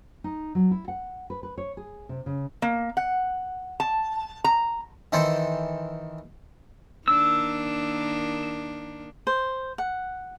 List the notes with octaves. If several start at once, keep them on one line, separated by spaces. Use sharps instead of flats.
D#4
F#3
E4
F#5
B4
B4
C#5
G#4
C3
C#3
A#3
F#5
A5
A#5
D#3 E3 A4 C5
D#3 A#3 D4 E6
C5
F#5